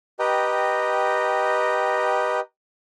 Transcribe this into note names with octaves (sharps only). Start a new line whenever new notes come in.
G4 B4 D#5 G5 A#5